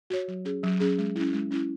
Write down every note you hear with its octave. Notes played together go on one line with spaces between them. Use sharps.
F#4 C#5
F#3
C#4 G#4
F#3
C#4 G#4
G#3
C#4 E4
G#3
C#4 E4